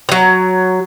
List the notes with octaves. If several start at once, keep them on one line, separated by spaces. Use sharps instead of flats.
F#3 A#5